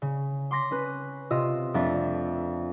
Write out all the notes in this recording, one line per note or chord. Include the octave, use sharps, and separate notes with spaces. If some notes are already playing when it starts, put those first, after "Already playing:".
C#3
C6 D6 A#6 B6
C#4 B4
C3 F4 D#5 E6
F2 A3 D4 E5 A6